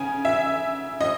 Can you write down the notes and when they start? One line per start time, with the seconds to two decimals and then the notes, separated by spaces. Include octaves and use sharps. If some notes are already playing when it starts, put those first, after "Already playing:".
Already playing: C#3 G#5
0.25 E5
1.01 D#5